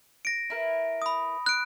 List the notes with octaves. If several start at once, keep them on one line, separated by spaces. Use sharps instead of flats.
A#6 D7
E4 A#4 B4
B5 D#6
F#6 D7